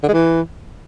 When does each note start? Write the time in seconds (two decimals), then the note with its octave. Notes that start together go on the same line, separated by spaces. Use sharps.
0.03 D3
0.08 G#3
0.14 E3